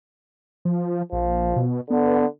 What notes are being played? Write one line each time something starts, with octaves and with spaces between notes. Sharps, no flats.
F3
A#1 F3
B2
D3 B3